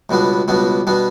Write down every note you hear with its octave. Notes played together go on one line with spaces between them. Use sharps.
C#2 B2 G3 B3 D4
C#2 B2 G3 B3 D4
B2 G3 B3 D4